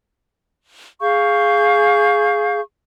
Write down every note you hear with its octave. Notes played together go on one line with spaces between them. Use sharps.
G#4 F5 C#6 G6